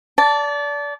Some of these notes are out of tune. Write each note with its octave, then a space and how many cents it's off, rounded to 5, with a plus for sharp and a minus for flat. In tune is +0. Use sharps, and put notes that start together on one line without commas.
D5 -25 A5 +0